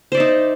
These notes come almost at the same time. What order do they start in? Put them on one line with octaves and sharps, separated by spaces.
C5 D5 E5 D#4